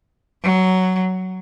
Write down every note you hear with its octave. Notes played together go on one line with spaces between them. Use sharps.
F#3